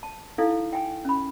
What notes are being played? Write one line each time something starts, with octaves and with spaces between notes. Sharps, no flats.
A5
D#4 E4 A4 F5
G5 G#5
C#4 B5